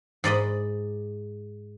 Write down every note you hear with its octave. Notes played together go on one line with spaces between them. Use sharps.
G#2 D5 D#5 B5